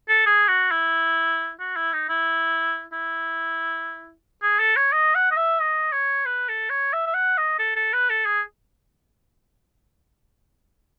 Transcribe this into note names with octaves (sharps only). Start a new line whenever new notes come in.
A4
G#4
F#4
E4
F#4
E4
D#4
E4
E4
G#4
A4
C#5
D#5
F#5
D#5
E5
D#5
C#5
B4
A4
C#5
E5
E5
F#5
D#5
A4
A4
B4
A4
G#4